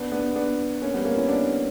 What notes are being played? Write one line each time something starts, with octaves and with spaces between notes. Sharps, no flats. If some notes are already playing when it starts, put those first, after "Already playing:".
Already playing: B3 D4
B3 D4
B3 D4
A#3 C#4
G3 B3
A#3 C#4
C#4 E4
B3 D4